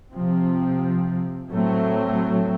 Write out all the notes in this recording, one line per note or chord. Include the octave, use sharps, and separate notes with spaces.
C3 F3 C4
A2 F#3 A3 C4